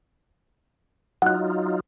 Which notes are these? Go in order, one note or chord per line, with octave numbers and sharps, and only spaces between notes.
F#3 D#4 F4 F#5 F#6